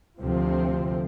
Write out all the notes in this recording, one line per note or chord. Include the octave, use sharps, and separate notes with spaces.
D2 C3 F3 C4